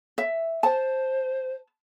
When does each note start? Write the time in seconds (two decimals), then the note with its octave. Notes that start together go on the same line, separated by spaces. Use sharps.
0.18 E5
0.63 C5 A5